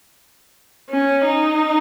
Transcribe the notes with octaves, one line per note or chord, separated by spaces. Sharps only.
C#4
D#4